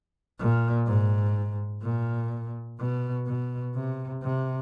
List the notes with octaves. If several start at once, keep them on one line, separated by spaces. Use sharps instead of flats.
A#2
G#2
A#2
B2
B2
C3
C3